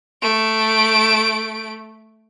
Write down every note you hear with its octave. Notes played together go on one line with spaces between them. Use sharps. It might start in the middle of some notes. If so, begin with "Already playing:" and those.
A3 D7